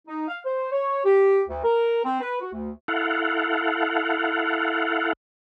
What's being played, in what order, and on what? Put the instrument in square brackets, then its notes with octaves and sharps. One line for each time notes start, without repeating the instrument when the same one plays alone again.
[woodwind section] D#4
F5
C5
C#5
G4
D2
A#4
C4
B4
F#4
D2
[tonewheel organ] E4 A4 F5 F#5